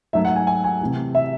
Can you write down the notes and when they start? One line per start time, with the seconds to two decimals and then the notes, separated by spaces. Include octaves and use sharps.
0.13 G#2 F#3 A3 E5
0.25 F#5
0.36 G#5
0.47 G#5
0.64 G#5
0.81 C3 E3 A3
1.15 E5